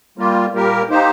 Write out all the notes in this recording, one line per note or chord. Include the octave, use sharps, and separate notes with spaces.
G3 A#3 F4
A#2 G3 A#3 G4 A#4
A#3 D#4 G4 C5